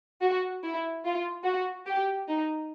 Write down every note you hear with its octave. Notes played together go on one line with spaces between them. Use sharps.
F#4
E4
F4
F#4
G4
D#4